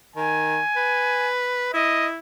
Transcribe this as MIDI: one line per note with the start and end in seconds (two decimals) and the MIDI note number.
0.16 0.59 51
0.16 1.30 80
0.76 1.69 71
1.74 2.18 64
1.74 2.07 75